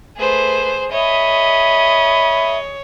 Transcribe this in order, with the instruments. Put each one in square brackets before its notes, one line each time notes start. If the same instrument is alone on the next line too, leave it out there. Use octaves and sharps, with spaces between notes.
[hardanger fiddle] A3 B4 [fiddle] G#4 C5
[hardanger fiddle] G#4 D#5 [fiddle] C#5 [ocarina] E5 [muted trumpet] B5